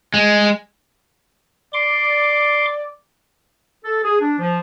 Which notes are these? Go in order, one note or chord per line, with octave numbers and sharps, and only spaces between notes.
G#3
D5 C6 D6
A4
G#4
D4
F3